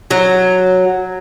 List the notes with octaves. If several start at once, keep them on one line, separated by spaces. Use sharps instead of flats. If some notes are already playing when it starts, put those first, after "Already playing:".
F#3